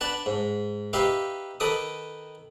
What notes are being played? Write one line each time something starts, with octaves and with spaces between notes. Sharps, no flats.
D4 B4 F#5 A5
G#2
D#4 G4 B4 E5 F5
D#3 A4 B4 D6 D#6